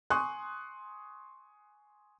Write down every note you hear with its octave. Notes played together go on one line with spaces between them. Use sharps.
G#5 C6 C#6 D#6 F#6